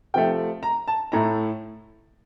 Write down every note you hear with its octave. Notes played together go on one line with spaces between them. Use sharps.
C3 F3 A3 G5
A#5
A5
A2 A3 A#5